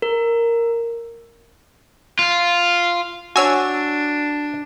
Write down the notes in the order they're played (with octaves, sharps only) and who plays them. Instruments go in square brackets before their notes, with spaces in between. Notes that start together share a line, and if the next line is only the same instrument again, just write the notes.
[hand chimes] A#4
[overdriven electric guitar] F4
[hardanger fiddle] D4 [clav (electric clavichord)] F#4 C#5 [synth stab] G#5 E6